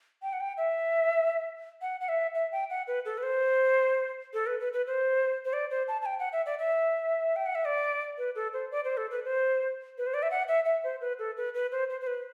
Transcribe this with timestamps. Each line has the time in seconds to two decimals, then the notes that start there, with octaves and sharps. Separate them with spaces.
0.22 G5
0.33 F#5
0.40 G5
0.58 E5
1.81 F#5
2.01 F#5
2.09 E5
2.35 E5
2.52 G5
2.70 F#5
2.88 B4
3.05 A4
3.18 B4
3.23 C5
4.34 A4
4.47 B4
4.60 B4
4.73 B4
4.87 C5
5.45 C5
5.53 D5
5.71 C5
5.88 A5
6.02 A5
6.06 G5
6.20 F#5
6.33 E5
6.46 D5
6.59 E5
7.36 G5
7.46 F#5
7.55 E5
7.65 D5
8.18 B4
8.35 A4
8.53 C5
8.71 D5
8.85 C5
8.97 A4
9.11 B4
9.25 C5
9.98 B4
10.07 C5
10.14 D5
10.23 E5
10.31 F#5
10.48 E5
10.65 E5
10.84 C5
11.01 B4
11.19 A4
11.37 B4
11.54 B4
11.72 C5
11.90 C5
12.01 C5
12.07 B4